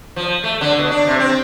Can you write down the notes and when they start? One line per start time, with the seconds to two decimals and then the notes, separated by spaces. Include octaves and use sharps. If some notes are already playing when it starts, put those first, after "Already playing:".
0.16 F3
0.44 A3
0.61 D3
0.79 B2
0.91 D4
1.07 C3
1.20 C4